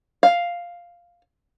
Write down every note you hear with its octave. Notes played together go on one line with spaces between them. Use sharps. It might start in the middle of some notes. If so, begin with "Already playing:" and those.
F5